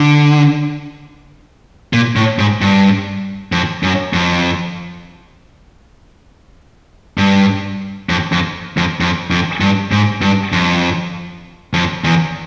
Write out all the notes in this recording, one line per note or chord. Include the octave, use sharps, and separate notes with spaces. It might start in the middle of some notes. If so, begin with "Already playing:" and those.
Already playing: D3
A#2
A2
G#2
G2
F2
F#2
F2
G2
F2
F2
F2
F2
F2
G2
G#2
G2
F2
F2
E2